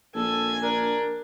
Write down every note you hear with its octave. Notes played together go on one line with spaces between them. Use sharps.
A#1 A4 G#5
D4 A#4